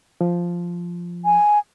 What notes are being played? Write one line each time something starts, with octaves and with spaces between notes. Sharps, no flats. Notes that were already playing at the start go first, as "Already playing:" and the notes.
F3
G#5